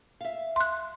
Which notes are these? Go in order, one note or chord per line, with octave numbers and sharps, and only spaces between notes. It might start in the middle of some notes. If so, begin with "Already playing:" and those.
E5 F5
C6 F#6